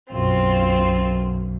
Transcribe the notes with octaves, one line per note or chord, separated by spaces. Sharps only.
B1 F#2 C4 F4